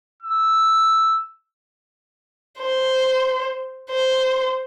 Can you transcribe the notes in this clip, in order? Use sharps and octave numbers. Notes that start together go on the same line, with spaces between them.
E6
C5
C5